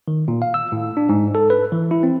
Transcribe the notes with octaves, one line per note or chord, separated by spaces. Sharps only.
D#3
A#2
F5
E6
A2
D4
G#2
A4
B4
E3
E4
C4